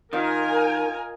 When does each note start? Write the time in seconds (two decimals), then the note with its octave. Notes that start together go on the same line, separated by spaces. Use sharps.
0.13 D#3 F4 A#4 D#5 G#5